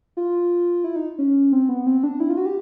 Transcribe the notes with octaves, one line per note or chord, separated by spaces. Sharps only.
F4
E4
D#4
C#4
C4
B3
C4
D4
E4
F4
F#4
G4